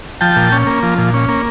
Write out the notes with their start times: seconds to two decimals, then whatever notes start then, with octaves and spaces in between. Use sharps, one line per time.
0.21 F3 G5 A5
0.36 A#2
0.52 C#4
0.67 A#3
0.83 F3
0.98 A#2
1.14 C#4
1.29 A#3